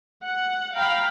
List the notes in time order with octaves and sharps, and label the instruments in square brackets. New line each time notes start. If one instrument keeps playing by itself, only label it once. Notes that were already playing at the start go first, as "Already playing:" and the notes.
[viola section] F#5
F5 G5 A#5 B5